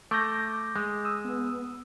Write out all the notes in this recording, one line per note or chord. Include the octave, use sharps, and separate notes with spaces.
A3 D6 G6 A#6
G#3
D#6 E6
B3